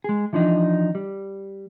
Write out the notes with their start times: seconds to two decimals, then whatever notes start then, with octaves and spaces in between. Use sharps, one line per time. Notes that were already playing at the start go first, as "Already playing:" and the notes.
0.04 G#3 G#4
0.33 E3 F3 D4 D#4
0.95 G3